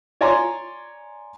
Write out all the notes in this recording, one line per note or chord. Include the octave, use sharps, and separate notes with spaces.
C#5 D5 G#5 A#5 C6 D6